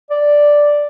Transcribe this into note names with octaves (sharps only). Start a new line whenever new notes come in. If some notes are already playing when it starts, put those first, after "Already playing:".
D5